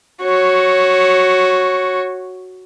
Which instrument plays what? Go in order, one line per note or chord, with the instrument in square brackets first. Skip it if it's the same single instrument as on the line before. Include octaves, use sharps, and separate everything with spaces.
[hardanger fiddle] F#4 C#5